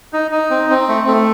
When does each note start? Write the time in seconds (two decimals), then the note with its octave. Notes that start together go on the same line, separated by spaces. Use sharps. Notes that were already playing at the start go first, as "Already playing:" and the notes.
0.13 D#4
0.31 D#4
0.50 C4
0.70 C4
0.89 A3
1.07 A3